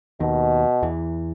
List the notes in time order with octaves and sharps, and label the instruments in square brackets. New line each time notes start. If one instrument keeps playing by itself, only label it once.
[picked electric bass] D#2 D#3 [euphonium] B2
[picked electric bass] E2 E3